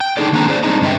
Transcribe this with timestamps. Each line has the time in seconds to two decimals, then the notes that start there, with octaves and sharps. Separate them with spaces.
0.01 G5
0.17 D4 D#4 G#4 A4 D5
0.33 D#3 A#3 C4 D4 D#5 A#5
0.48 G#4 C5 D5
0.63 G3 C4 D4 D#4 D#5 A#5
0.82 G2 D3 B4 D#5 E5 G5